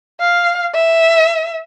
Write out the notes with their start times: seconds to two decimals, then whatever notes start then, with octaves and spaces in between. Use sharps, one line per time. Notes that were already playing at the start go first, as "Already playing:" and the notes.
0.20 F5
0.74 E5